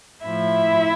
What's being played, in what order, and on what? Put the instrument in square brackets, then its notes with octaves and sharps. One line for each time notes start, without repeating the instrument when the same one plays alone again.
[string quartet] A2 F3 E4 E5